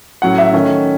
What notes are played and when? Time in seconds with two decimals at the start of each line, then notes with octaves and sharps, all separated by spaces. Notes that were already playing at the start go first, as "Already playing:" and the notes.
0.22 A2 F#3 C#4 F#5
0.38 E5
0.53 D#3 A3 C#4